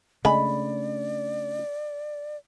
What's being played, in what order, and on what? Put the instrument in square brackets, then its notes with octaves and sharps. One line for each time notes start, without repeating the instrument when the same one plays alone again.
[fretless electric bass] C#3 A3 D4 [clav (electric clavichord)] G#3 [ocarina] D5 [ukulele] B5